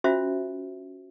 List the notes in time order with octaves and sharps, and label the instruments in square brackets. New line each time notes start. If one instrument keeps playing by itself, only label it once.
[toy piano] C#4 F4 F#4 C5 E5